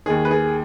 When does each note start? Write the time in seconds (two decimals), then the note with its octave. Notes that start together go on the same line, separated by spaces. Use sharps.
0.06 D#2 D#3 G#4
0.25 B4
0.31 G#4